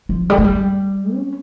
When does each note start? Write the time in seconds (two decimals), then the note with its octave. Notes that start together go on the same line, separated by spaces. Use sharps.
0.09 F3
0.30 G3
0.38 A3
0.44 G3
1.14 C#4